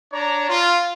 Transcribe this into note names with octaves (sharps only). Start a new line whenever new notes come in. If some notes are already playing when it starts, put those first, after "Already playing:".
D4 C#5 D5 A#5
F4